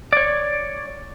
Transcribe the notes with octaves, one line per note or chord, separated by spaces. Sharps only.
C#5 D5